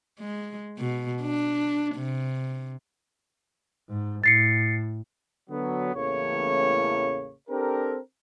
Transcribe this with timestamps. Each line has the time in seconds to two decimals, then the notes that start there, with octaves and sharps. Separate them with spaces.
0.20 G#3
0.79 B2
1.22 D4
1.95 C3
3.90 G#2
4.24 A2 A6 C7 C#7
5.50 D3 F#3 B3
5.94 A1 E2 A2 C#3 A#3 C#5
7.49 C4 D4 G4 A4 A#4